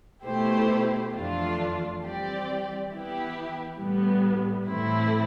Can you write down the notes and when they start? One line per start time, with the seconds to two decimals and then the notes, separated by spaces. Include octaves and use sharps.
0.25 B2 A3 E4 G4 C5
1.13 F2 E3 A3 D4 F4
2.02 E3 G3 C4 G4 D5
2.90 E3 B3 E4 G4
3.78 A2 G3 B3
4.67 A2 E3 A3 C4 E4